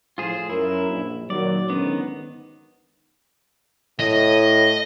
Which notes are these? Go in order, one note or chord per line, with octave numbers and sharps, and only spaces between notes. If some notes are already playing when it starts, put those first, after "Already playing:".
A2 F3 F4 G#4 C5
F#2 E4 A#4
A#1
A#2 D#3 F#3 D5
G#2 D3 D#3 B3 C#4
A2 D#5